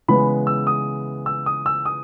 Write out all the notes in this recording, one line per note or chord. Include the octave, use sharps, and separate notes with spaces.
C#3 E3 G#3 B3 B5
E6
D#6
E6
D#6
E6
D#6